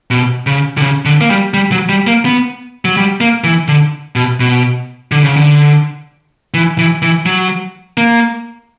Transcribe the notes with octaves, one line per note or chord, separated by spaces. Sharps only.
B2
C#3
D3
C#3
D3
A#3
G3
G3
F#3
G3
A#3
B3
F#3
G3
A#3
E3
D3
B2
B2
D3
C#3
D3
E3
E3
E3
F#3
A#3